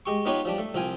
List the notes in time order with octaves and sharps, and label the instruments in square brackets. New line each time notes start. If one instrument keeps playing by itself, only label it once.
[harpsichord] G#3 G4 C#6
B3 D#4 F4 G4 B4 C#5
F3 G3 D4
A3
C2 F3 F4 G5 G#5